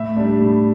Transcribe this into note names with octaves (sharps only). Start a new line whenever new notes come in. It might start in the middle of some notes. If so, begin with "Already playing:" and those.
Already playing: A2 E5
G3 D4
A2